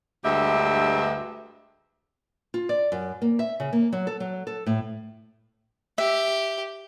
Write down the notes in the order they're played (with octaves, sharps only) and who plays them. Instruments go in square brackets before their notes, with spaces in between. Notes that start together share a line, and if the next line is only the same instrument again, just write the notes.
[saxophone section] D2 G2 G#3 G4 E5
[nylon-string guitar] F4
D5
F#2
A#3
E5
C#3
A#3
F#3
A4
F#3
A4
A2
[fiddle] G4 [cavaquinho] E5